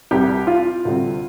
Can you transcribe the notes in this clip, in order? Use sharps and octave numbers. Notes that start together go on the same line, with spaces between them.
C2 C3 G3 C4 G4
F4
D2 C3 G3 C4